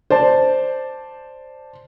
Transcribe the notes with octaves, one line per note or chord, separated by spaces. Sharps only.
C5 D5 A5